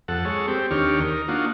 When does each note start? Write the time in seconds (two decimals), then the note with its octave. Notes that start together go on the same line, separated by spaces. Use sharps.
0.08 F2 A4 F#5
0.25 G#3 A4 C#5
0.48 C4 G4
0.71 D#2 D#3 D4 G4 C#5 F6
1.00 D#4 A#4
1.28 A#3 D4 D#4 F4 F#4